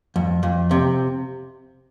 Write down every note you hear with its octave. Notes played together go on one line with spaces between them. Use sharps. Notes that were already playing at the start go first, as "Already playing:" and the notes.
F2
F2
C3